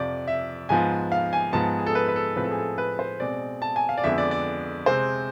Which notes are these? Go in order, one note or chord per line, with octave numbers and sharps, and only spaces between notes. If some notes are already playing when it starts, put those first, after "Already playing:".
Already playing: F2 C3 F3 D5
E5
G#2 F3 B3 G#5
F5
G#5
G#2 F3 G#3 B3 A5
G#4
A4
B4
B4
A4
A2 F3 G#3 C4 B4
A4
G#4
A4
B4
C5
B2 G#3 C4 D5
A5
G#5
F5
D5
F2 D3 G#3 B3 E5
D5
D5
C3 G#3 C4 C5